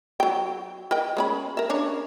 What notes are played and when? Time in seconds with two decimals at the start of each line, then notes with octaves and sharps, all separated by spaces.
0.20 F#3 G5
0.91 A#4 D#5 G5
1.17 G#3 C#4 B5
1.57 A#4 E5
1.69 C#4 D4 C#5